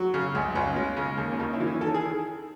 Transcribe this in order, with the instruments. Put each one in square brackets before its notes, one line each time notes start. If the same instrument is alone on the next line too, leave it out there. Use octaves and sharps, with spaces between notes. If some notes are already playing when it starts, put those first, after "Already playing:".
Already playing: [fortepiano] F#3
C#3
C#2
C#2 C#4
G#3
C#3
D#2
C#4
D#2 D#4
E4
E3
C#4
D#3 A4
G#4